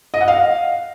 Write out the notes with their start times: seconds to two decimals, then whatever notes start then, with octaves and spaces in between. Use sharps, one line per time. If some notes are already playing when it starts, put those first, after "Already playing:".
0.14 D#5
0.21 F#5
0.28 F5